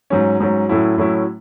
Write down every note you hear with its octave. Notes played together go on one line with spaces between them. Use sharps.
G#2 F#3 C#4
G#2 F#3 C#4
A2 F#3 C#4 E4
A2 F#3 C#4 E4